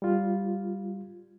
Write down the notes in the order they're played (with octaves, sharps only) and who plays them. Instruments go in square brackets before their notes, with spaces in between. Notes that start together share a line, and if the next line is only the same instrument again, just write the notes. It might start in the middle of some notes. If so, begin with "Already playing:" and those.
[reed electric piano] G3 F4